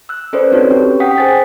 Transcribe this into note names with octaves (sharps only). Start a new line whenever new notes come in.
E6 F#6
C#4 A4 B4 C5 D5
C4 D#4 F#4 A4 B4 C#5
C#4 G4
F#5 G5 D#6 B6
G#4 C5 G#5 A6 B6